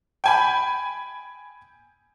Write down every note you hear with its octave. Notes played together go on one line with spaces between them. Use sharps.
G5 G#5 B5